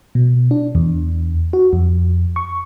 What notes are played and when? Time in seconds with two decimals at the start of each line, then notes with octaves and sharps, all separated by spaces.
0.15 B2
0.51 D4
0.75 E2
1.53 F#4
1.73 F2
2.36 C#6